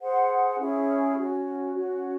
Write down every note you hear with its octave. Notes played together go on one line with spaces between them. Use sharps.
G#4 C5 F#5
C#4 E4 G#4
C#4 F#4 C#5
C#4 F#4 C#5